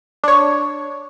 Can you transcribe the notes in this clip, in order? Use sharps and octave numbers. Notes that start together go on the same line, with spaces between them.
D4 C#5